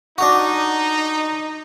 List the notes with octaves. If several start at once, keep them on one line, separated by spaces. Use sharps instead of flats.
D4 D#4 F#4